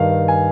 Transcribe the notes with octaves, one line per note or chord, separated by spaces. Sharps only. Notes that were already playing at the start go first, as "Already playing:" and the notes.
Already playing: G2 D#3 F5
G#5